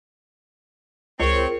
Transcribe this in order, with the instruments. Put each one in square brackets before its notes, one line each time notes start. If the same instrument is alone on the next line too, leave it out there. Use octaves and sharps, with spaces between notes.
[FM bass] C#2 [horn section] C4 C#5 [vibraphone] F4 G#4 A#4